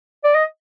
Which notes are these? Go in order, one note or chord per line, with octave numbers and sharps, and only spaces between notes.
D5
D#5